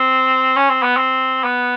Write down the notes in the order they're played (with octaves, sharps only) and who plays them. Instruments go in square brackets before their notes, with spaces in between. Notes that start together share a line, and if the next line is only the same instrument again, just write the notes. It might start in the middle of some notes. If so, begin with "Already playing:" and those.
Already playing: [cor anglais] C4
C#4
C4
B3
C4
B3